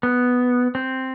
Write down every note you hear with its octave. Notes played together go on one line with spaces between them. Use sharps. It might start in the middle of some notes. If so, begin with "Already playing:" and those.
B3
C4